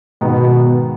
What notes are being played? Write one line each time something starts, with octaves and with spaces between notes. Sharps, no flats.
G#2 B2 D#3 B3 D#4